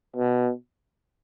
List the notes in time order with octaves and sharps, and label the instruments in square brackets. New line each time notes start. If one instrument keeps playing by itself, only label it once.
[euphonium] B2